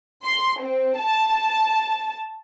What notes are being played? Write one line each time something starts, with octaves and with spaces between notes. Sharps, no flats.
C6
C4
A5